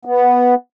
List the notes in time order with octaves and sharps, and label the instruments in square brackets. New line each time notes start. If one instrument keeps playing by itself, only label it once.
[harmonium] B3